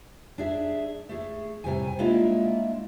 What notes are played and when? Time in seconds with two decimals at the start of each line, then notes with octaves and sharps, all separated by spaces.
0.38 D4 G#4 E5
1.09 A3 G#4
1.64 A2 C3 G3 G#5
1.99 G#3 A#3 D4 E4 F4